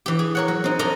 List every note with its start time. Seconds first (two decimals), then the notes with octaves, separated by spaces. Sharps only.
0.06 E3 G4
0.19 G#4
0.35 A#4 C#5 F#5
0.48 F#3
0.64 C4 D#4
0.79 A4 A#4 C5 D5 D#5 A#5